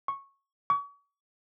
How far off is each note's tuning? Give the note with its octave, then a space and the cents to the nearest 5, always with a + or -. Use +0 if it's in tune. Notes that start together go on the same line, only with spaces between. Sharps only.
C#6 -10
C#6 +40